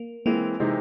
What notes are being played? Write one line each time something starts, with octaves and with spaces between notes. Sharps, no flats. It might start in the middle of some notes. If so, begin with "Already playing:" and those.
Already playing: A#3
E3 G#3 A#3 C4
C3 E3 G#3 C4 D#4